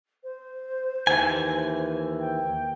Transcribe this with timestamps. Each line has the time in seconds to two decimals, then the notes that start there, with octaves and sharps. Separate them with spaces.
0.24 C5
1.07 D#2 E3 G#5
2.20 G5